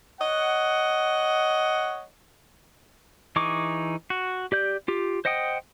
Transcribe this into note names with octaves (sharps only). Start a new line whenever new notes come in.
C#5 D#5 F#5
E3 D#4 G#4 C#6 D6
F#4
G4 D5 G6
F4 G4
C5 D#5 F#5 G5 D#6